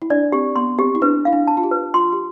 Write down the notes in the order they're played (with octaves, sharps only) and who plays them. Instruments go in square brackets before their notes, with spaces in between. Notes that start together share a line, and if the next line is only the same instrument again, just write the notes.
[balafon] E4
[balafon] D4 [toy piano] D5
[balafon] C4 [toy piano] G4
[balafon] B3 [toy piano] C6
[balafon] C4 [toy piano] G4
[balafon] E4
[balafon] D4 [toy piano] B4
[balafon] E4 [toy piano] F5
[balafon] D4
[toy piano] A5
[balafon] F4
G4
[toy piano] B4
[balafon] F4 [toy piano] C6
[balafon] G4